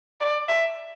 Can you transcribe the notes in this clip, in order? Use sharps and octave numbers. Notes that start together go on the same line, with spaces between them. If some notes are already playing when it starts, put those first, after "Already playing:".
D5
E5